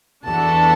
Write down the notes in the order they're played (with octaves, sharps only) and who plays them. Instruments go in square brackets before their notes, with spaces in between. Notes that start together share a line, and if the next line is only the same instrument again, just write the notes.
[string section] E2 E3 D4 F#4 A4 [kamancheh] A5